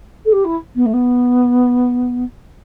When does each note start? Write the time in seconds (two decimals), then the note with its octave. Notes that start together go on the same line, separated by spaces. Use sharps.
0.25 A4
0.32 G4
0.44 E4
0.75 B3
0.85 A3
0.93 B3